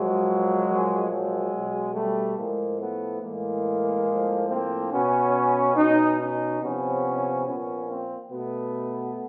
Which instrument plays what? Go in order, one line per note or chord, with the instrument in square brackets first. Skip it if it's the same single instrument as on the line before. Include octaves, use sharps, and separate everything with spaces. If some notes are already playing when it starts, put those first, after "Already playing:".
Already playing: [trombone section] A#2 F3 F#3 G#3
A#2 F3
F#3 G#3
B2
G3 A3
A2 F3 G#3 A#3
A3 B3
A2 E3 G#3 A#3
A2 F3
A#3 C4
B2 B3 C#4
B2 C#4 D#4
C#4 D#4
C3 F3 B3 C#4
A#2 F3 B3 C#4
A#3 C4
B2 A3 B3